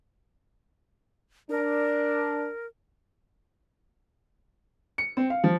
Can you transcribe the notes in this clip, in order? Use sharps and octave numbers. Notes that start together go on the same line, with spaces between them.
D4 A#4
C#7
C4
F5
F3